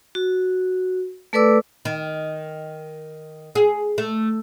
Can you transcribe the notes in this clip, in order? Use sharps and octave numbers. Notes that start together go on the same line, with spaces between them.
F#4
A3 A4 B4 D5 D6 E6
D#3
G#4
A3